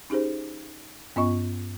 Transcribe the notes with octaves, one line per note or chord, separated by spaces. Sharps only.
C#4 D#4 G4 G#4 C5
G2 B3 C#4 F4 D#5 C#6